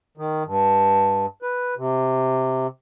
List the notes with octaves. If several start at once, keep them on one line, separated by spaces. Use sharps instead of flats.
D#3
G2
B4
C3